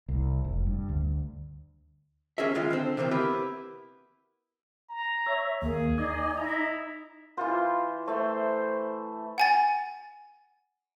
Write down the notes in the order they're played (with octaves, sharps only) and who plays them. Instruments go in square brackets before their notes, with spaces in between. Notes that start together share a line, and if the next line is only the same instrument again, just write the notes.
[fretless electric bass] C2
F1
G2
D2
[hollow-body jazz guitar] D#2 C#4 G#4 A#4 E5
G2 D#3 G#3 F4 F5
D3 C4
C3 D#3 E3 A#3 C4
B3 E4 G4 A#4 B4
[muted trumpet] A#5
[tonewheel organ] C#5 E5
[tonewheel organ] D#2 [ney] A#3 [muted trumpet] G#4
[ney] D#4 [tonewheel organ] D5 D#5 G#5
[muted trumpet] E4 [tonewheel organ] D#5 A#5
[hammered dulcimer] E3 C5 [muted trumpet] F4
[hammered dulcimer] A3 E5 [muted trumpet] C5
[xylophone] F#5 G#5 A6